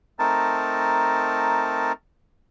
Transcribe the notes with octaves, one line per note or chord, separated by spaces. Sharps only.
A3 C4 D#4 A#4 A5